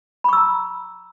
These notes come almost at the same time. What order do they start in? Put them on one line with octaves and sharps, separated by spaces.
B5 C#6 E6 A#5